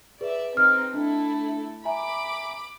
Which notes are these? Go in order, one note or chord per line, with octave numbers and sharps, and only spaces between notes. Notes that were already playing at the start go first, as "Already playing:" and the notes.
G#4 B4 D5 E5
C4 D#4 F6
A3 D4 E4 A4
E5 G#5 A#5 B5 D6